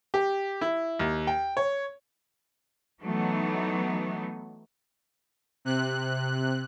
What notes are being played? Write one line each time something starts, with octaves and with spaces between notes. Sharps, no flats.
G4
E4
D#2
G5
C#5
E3 F#3 A3 B3 D#4
C3 F#6